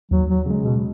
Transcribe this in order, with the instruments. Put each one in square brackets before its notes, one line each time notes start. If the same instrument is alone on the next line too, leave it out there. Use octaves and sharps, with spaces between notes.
[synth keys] D#2 [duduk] F#3
[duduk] F#3
[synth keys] C#3 G#3
[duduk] B2